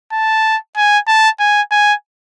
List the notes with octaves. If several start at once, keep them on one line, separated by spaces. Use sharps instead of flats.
A5
G#5
A5
G#5
G#5